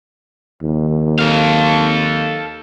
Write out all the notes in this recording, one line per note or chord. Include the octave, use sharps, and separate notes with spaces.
D#2
A4 F5